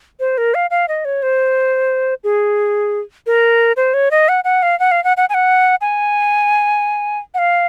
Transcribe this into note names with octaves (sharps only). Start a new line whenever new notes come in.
C5
A#4
F5
F5
D#5
C#5
C5
G#4
A#4
C5
C#5
D#5
F#5
F#5
F5
F#5
F5
F#5
F#5
G#5
F#5
G#5
F#5
F5